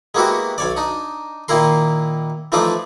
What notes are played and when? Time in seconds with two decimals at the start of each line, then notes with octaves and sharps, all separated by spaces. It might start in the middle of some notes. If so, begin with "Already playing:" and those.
0.15 G#3 A#3 B3 E4 F#4 G4
0.58 B1 C#5 D5
0.77 D4 D#4
1.48 A#2 D#3 A#3 E4 A#4 C6
2.52 E3 F3 A3 D#4 F4 D5